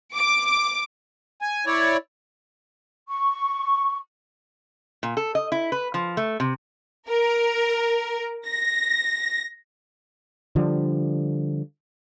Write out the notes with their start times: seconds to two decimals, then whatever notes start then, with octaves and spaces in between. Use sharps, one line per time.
0.15 D6
1.42 G#5
1.66 E4 C#5 D5
3.08 C#6
5.03 A#2
5.17 A4
5.35 D#5
5.52 E4
5.72 B4
5.94 F3
6.17 A3
6.40 C3
7.09 A#4
8.47 A#6
10.56 D3 F3 G3